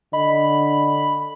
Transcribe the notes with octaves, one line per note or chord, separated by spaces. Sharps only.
D3 D#5 B5